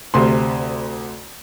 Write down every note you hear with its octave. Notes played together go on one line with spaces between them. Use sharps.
D2 C3 C6